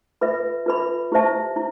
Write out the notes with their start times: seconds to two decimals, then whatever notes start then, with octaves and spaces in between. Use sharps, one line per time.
0.21 F4 B4 E5 B5
0.66 F4 B4 E5 B5
1.12 E4 G4 C5 E5 A5
1.56 E4